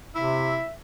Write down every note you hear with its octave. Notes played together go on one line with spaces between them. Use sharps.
C3 E4 E5